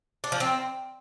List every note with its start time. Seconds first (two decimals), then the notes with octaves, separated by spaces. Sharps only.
0.24 D4
0.32 F3
0.40 C4